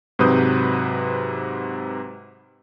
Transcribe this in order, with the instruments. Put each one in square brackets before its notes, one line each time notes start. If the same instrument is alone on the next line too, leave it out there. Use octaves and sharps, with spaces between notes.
[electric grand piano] G#2 C3 F#3 B4 D#6 G6